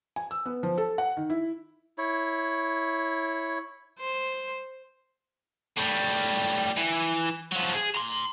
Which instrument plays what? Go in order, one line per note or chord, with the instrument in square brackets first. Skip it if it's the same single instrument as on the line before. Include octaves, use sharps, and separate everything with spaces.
[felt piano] G#5
E6
B3
F3
A4
F#5
D#3
E4
[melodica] E4 C#5
[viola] C5
[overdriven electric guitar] A2 G3
E3
F3 F#3
G#4
A#5 C6